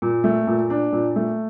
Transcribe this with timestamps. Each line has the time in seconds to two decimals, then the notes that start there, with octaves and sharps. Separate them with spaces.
0.02 A#2
0.24 A3
0.47 A#2
0.70 D4
0.92 A#2
1.16 A3